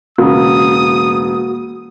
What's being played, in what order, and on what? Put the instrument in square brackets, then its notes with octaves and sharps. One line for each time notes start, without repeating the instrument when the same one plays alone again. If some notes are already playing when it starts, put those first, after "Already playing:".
[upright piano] E1 C#3 [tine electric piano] A#3 F#4 [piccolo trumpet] D#6